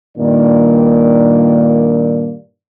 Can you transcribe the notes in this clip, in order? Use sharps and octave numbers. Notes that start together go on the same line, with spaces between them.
G2 A#2 D#3 A#3 D4 D5